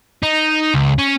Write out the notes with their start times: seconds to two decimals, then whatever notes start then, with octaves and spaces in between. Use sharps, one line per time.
0.23 D#4
0.74 C#2
0.99 C#4